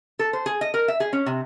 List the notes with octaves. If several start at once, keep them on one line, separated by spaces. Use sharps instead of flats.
A4
C5
G#4
D#5
A#4
E5
G#4
C#4
C3